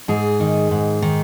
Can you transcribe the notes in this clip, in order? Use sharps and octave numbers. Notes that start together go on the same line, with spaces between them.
G#2 G#4
D#3
G#2
D#3